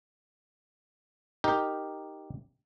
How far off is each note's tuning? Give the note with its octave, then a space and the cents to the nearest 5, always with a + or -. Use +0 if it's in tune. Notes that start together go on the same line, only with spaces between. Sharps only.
D#4 +0 G4 +0 A#4 +0